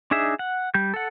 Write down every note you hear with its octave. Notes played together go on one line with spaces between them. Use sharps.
D4 D#4 G#4 E5
F#5
G3 G6
A4 F#5